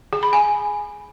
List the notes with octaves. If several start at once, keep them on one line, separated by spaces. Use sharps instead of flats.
G#4
B5
G#5